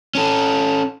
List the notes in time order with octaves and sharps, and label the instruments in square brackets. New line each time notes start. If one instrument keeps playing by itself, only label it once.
[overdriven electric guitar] C#4 A4